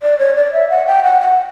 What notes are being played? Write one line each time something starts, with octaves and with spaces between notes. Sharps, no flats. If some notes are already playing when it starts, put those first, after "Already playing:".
D5
C#5
D5
E5
F#5
G5
F#5
F#5